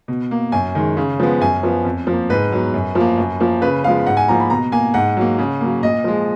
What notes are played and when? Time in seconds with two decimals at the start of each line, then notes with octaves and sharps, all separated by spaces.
0.08 B2
0.31 A#3
0.52 F#2 G#5
0.75 D#3 G#3
0.97 C#3
1.20 F3 G#3 B3
1.41 F#2 G#5
1.63 F3 B3
1.85 F2
2.07 F3
2.12 A#3
2.30 G#2 B4
2.52 F#3 B3
2.74 F#2
2.95 F3 A#3
3.18 F#2
3.40 F3 A#3
3.62 C#3 B4
3.84 F3 G#3 B3 F5
4.06 G#2 F#5
4.17 G#5
4.28 F3 A#3 A#5
4.40 B5
4.50 B2 A#5
4.72 A#3 G#5
4.94 G#2 F#5
5.17 F#3 A#3
5.39 C#3
5.61 F#3 A#3
5.83 A#2 D#5
6.04 F3 G#3